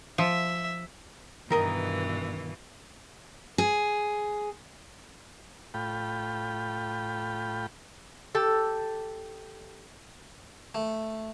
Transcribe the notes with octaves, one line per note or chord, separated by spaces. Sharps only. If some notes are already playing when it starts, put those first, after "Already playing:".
F3 E5
G2 B2 D#3 E3 A#4 D#5
G#4
A2 F4 G5 B5
G4 A4
A3